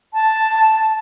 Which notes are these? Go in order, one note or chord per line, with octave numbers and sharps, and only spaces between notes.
A5